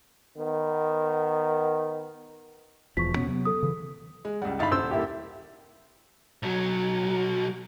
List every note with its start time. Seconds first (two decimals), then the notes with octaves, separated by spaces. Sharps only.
0.38 D#3 B3
2.97 E1 E2 F3 C#6 B6
3.16 B2 B3 C#4
3.27 C3 F#3 B3
3.45 A4 D#6
3.63 C#3 E3
4.25 G#3
4.42 C#2 G3 F#5
4.59 G1 D#4 E4 F5 B5 A6
4.72 D#1 C5 E6
4.91 A#3 E4 G4
6.43 B1 F#3